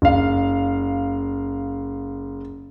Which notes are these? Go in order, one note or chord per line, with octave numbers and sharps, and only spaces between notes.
F#1 F5